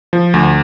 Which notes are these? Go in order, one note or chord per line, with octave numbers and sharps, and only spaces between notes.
F3
D2